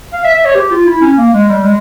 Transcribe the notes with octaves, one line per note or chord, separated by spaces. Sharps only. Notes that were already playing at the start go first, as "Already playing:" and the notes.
F5
E5
E5
C#5
G4
F4
E4
C#4
A#3
G#3
G3
G#3